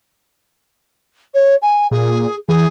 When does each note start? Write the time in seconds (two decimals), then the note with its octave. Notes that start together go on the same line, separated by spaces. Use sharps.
1.34 C#5
1.62 G#5
1.91 A#2 G#4
2.49 E3 G#4